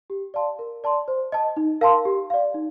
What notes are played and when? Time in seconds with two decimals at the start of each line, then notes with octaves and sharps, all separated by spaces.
0.10 G4
0.34 D5 F5 A5 C6
0.59 A#4
0.84 D5 A5 C6
1.08 C5
1.32 D#5 A5
1.57 D#4
1.81 A#4 F5 A5 C6
2.05 G4
2.30 D5 F5
2.54 D#4